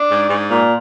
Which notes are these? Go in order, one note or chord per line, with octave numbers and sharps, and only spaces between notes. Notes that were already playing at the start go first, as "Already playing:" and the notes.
Already playing: D4
G#2
G#2
A#2